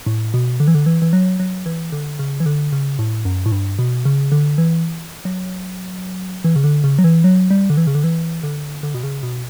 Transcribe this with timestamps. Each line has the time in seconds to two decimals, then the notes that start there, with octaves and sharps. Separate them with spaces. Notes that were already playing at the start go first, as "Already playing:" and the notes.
0.06 A2
0.34 B2
0.60 D3
0.68 E3
0.75 D3
0.86 E3
1.02 E3
1.13 F#3
1.40 F#3
1.66 E3
1.92 D3
2.19 C#3
2.40 E3
2.46 D3
2.72 C#3
2.99 A2
3.25 F#2
3.46 A2
3.52 G2
3.79 B2
4.05 C#3
4.32 D3
4.58 E3
5.25 F#3
6.44 E3
6.56 C#3
6.64 D3
6.84 C#3
6.99 F#3
7.04 E3
7.24 F#3
7.51 G3
7.70 D3
7.77 E3
7.87 C#3
7.95 D3
8.04 E3
8.43 D3
8.83 D3
8.94 B2
9.03 C#3
9.23 B2